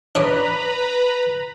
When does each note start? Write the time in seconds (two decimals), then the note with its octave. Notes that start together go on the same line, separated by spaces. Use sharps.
0.15 D4 B4 C#5 D5 A#5 B5